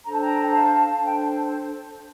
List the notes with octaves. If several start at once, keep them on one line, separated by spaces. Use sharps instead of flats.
D4 A4 C5 A#5
A5
G5 A#5
F5 A5
D4 A4 C5 A5
G5